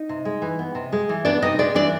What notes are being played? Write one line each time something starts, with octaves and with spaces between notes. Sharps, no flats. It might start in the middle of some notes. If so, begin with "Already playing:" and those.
Already playing: D#4 D#5
C3
G#3
E3
B3
C3
G#3
E3
B3 D4 D5
C3 D#4 D#5
G#3 D4 D5
E3 D4 D5